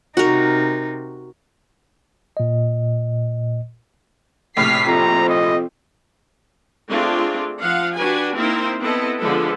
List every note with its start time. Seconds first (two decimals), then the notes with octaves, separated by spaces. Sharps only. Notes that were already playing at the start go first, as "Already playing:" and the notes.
0.17 C3 D#4 F#4 A#4
2.37 A#2 D#5
4.57 A#1 A2 C3 F6 B6 C7
4.87 F2 C4 A#5
5.29 D#5
6.89 A3 C4 D4 F4 G#4
7.60 F3 F5 F#5
7.95 D4 F#4 G4 B4 G#5
8.34 A#3 C4 D#4 E4 A#4 C5
8.80 B3 C4 E4 A4 D#5
9.19 D3 F3 G#3 B3 A4